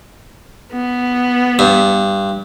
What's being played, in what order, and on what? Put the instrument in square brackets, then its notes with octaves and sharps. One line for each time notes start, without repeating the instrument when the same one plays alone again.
[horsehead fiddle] B3
[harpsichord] G2